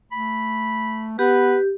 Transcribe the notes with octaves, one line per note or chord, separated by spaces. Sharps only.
A3 B5
B3 G4 B4